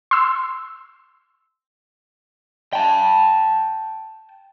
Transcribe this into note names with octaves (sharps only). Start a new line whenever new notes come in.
C6 E6
G5 A5